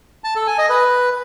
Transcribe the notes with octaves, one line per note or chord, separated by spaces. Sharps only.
A5
A4
G#5
D#5
B4